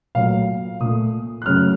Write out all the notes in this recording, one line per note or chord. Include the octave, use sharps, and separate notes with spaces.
A#2 F#3 A3 F5
A#2 A3 D#6
F#6
F#2 C#3 F#3 A3 F6